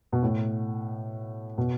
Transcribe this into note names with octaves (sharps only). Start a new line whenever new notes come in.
B2
A2
B2